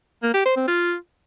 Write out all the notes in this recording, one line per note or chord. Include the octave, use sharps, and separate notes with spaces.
A#3
G4
C5
C4
F4